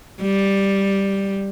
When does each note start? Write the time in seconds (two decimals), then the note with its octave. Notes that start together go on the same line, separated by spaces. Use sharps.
0.22 G3